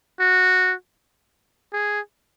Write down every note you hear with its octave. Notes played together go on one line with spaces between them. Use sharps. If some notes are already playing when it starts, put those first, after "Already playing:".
F#4
G#4